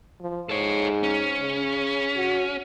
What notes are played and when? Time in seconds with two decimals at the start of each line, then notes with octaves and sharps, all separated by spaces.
0.21 F3
0.49 G#2 A4 C#5
1.03 C#4
1.40 C#3
2.16 F#4